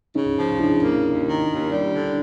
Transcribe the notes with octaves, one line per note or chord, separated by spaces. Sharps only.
C#3 C#4 D#4
F3
C#3 D4 E4
A#3
D#2
D#3
D#2
G3
D3